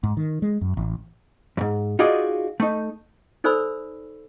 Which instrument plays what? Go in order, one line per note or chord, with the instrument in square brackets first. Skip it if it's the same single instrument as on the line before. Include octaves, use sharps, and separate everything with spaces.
[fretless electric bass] G#2
D#3
G#3
F#2
A1
[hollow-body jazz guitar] F2 G#2
D#4 F4 F#4 G#4 D5 D#5
A3 D#4
[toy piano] D#4 A4 C5 D5 B5 E6